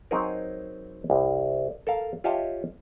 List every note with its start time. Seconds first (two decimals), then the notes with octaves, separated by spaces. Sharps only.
0.11 F#3 C4 D#4 G#4 A#4
1.10 C2
1.87 A4 A#4 F5
2.24 F4 G4 C#5 D#5 E5 A5